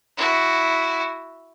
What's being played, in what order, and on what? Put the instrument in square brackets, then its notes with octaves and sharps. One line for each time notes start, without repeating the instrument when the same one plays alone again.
[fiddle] E4 F#4